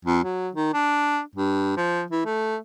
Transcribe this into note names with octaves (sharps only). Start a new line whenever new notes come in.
F2
F#3
D#3
D4
G2
F3
E3
A3